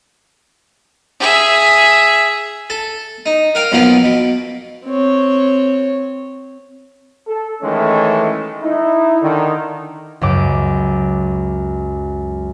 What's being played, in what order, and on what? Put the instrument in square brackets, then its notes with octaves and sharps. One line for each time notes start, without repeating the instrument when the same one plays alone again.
[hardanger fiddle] G#4 E5
[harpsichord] A4 A5
D#4
A#4 F5 G5
B1 F2 F3 A#3 B3 F4
B2
[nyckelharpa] C4 C#5
[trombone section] A4
D#3 E3 G#3 A3 C#4
D#4 E4
D3 D#3
[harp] C#2 F#2 D6